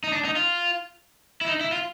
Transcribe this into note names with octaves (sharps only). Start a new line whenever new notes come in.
D#4
D4
D#4
F4
E4
D#4
E4
F4